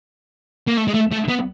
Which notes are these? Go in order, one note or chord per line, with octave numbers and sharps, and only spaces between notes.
A#3
A3
G#3
A3
A3
B3